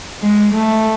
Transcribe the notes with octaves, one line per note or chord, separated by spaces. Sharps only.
G#3
A3